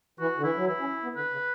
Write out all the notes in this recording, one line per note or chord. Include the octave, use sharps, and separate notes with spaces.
E3 F#4
D3
E3 E4
F#3
E3 E4
C#4
B3
D3 B4
C#3